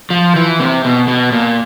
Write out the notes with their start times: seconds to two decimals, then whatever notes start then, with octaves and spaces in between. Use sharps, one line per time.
0.10 F3
0.36 E3
0.60 C3
0.84 B2
1.08 B2
1.32 A#2